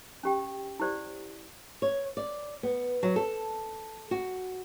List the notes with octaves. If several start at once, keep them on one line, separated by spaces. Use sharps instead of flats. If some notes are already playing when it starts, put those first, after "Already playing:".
C#4 G4 G5
E4 G4 C5 D5
C#5
D5
B3
F#3
A4
F#4